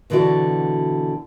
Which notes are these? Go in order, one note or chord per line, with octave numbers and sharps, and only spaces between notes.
B2 D3 E3 F#4 D5